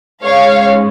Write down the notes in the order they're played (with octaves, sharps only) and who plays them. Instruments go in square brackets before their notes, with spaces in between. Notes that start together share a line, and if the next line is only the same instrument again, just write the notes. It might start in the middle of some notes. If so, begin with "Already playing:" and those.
[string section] G#2 G#3 C#4 C#5 F5